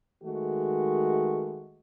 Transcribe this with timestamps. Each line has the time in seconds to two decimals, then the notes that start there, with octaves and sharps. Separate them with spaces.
0.23 D#3 G#3 A3 F#4